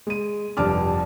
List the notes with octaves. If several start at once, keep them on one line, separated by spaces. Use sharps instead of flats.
G#3 D#7
F1 G2 D4 A5 D6 F6